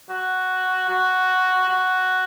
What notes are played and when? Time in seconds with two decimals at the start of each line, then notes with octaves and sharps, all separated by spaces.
0.10 F#4
0.88 F#4
1.69 F#4